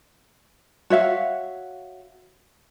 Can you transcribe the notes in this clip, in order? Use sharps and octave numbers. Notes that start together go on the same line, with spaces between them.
F#4 C#5 E5 F5